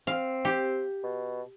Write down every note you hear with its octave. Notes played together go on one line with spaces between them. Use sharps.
C4 F5
G4
B2